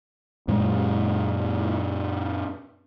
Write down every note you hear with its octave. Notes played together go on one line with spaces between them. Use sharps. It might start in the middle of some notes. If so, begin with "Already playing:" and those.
F#2 A#2 F#3 G#3